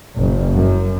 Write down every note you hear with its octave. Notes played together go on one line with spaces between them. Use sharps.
F#1
F#2